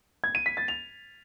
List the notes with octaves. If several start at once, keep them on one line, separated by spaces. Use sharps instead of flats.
G#6
D#7
B6
A6
F7